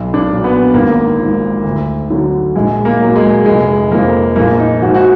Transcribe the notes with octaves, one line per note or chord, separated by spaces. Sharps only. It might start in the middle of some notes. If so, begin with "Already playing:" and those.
Already playing: B1
D4
A#2 F#3
B3
G#1 A#3
G#2 F3
D2
D3 F#3
A#1 G#3
A#3
A#2 F#3
G#3
F1 G#3
F2 F3 A#3
A#1 A#3
D#4
G#2 F3 F#4
F#4